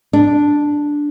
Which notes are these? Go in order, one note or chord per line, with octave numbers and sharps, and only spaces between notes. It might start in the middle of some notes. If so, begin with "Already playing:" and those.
D4